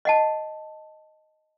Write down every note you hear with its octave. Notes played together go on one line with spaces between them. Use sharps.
D#5 F#5 A5